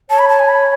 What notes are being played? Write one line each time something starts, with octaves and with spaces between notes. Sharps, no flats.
C#5 A5
B5
A5
G#5
B5